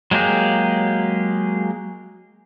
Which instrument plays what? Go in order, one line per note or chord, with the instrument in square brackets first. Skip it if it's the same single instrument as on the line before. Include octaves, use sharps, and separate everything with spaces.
[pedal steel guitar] F#3 G#3 A#3 G4 G#4